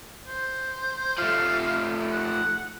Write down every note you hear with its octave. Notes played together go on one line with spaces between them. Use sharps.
C5
F3 A3 F5
F#5